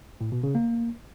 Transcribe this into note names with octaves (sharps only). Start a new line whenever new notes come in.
A2
B2
C#3
A#3